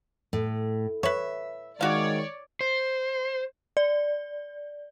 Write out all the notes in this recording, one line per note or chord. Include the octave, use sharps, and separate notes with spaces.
A2
B4 C#5 E5
D#3 G#3 F#4 C#5 D5 F5
C5
D5